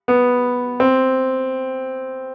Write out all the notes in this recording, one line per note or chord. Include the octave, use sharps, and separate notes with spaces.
B3
C4